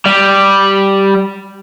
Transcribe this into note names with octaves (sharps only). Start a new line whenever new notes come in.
G3